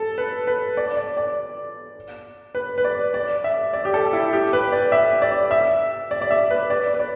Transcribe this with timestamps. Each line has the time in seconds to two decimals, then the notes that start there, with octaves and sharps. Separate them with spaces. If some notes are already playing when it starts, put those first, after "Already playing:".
Already playing: A4
0.18 B4
0.47 B4
0.77 D5
0.97 D5
1.17 D5
2.55 B4
2.78 B4
2.84 D5
3.14 D5
3.44 E5
3.73 D5
3.85 G4
3.94 A4
4.13 E4
4.33 G4
4.53 B4
4.72 D5
4.92 E5
5.22 D5
5.51 E5
6.11 D5
6.22 D5
6.31 E5
6.51 B4
6.70 D5
6.94 B4
7.00 D5